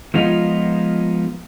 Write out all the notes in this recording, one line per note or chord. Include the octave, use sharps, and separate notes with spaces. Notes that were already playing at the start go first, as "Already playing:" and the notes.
F3 G#3 B3 D#4 F4